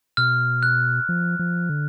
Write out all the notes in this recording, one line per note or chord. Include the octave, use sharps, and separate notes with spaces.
B2 F6
F#6
F3
F3
D3